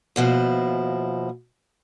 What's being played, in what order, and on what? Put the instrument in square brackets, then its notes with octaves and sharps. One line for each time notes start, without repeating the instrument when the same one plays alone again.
[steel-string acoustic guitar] D#2 B2 F3 E4